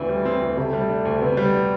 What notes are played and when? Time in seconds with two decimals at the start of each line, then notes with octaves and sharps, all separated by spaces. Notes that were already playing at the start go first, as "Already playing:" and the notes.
Already playing: D2 D3 E3 C4
0.09 G3
0.25 C4
0.41 D2
0.57 C3 A3
0.73 G3
0.89 D4
1.05 D2
1.21 C3 B3
1.37 G3
1.53 D4